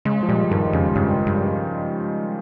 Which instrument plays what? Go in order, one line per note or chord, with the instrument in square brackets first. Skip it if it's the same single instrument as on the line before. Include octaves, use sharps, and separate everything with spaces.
[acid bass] C#3 [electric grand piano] G#3
[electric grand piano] F3
[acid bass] A#2 [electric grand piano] G3
[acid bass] G2 [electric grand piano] D#3
[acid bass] F2 [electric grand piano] C#3
[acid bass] G2 [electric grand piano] C#3
[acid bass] G2